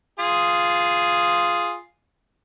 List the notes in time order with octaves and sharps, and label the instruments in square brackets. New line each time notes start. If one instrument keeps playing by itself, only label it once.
[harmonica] F4 G#4